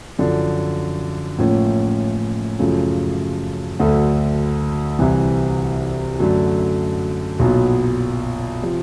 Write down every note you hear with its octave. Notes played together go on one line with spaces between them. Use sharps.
F#2 D3 F3
A1 A2 F3 A#3 C#4
F#2 C#3 F3 A3
D2 D3 F#3 A3
C2 C3 E3
F#2 D3 F#3 A3
B1 A#2 F#3 B3
C3 F3